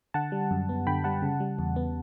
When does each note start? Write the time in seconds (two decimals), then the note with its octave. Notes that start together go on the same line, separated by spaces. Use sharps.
0.14 D3 F#5 A5
0.32 G3
0.51 F#2
0.69 B3
0.87 D3 G5 B5
1.04 G3 F#5 A5
1.22 C#3
1.40 G3
1.59 E2
1.76 B3